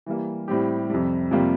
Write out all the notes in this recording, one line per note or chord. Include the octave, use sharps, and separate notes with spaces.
E3 G3 A#3
A2 G3 C4 G4
F2 C3 G3
F2 C3 G3 A#3 F4